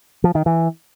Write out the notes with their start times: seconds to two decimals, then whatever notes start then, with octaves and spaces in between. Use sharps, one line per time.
0.24 F3
0.35 D#3
0.46 E3